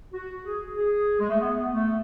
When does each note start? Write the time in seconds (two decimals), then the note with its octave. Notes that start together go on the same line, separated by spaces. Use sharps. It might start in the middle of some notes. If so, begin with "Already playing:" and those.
0.13 F#4
0.45 G#4
0.77 G#4
1.20 G#3
1.30 A3
1.40 B3
1.73 A3